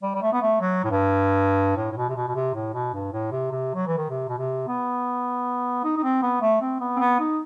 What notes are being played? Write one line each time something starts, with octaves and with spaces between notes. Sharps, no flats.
G3
G3
A3
B3
A3
F#3
A2
G2
A2
A2
B2
C3
B2
B2
C3
A2
B2
G2
A2
C3
C3
F#3
E3
D#3
C3
B2
C3
B3
D#4
D#4
C4
B3
A3
C4
B3
C4
B3
D#4